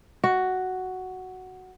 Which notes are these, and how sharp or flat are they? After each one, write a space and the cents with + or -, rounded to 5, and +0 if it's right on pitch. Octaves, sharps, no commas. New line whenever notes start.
F#4 +5